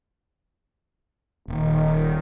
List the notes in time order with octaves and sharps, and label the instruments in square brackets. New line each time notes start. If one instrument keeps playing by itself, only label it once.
[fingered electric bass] D#1 [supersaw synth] D#3